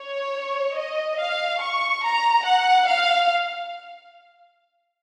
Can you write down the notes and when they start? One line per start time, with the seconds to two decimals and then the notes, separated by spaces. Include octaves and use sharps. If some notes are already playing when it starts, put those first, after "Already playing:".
Already playing: C#5
0.77 D#5
1.19 F5
1.61 C#6
2.03 A#5
2.44 F#5
2.86 F5